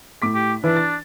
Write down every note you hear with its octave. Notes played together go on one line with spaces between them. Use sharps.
A2 D6 B6
G4
E3 D4 E4 B4
A6